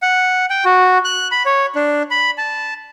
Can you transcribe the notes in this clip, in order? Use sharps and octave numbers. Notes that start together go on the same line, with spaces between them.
F#5
G5
F#4
F#6
B5
C#5
D4
B5
A5